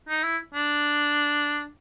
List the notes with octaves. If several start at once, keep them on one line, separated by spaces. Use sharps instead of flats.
D#4
E4
D4